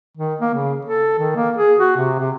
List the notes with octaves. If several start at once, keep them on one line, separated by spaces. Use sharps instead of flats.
D#3
A#3
C#3
A4
D#3
A#3
G#4
F#4
C3
C3